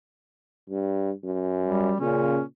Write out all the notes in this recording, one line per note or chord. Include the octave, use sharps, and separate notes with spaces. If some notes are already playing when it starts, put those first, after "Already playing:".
G2
F#2
G3
A#2 C#3 C#4